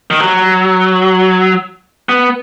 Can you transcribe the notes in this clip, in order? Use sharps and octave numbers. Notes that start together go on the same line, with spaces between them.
D#3
F#3
B3